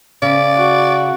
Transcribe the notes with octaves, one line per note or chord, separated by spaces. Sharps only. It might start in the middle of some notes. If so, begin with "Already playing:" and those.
C#3 D5
F#4